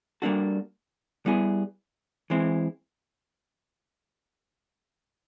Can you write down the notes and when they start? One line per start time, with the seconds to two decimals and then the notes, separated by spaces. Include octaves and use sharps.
0.22 G3 A#3 D4 F#4 A4
1.26 G3 B3 E4 G#4
2.30 E3 G#3 C4 E4